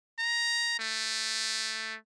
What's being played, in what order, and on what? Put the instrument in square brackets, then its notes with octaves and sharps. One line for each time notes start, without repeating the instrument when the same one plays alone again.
[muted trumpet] A#5
A3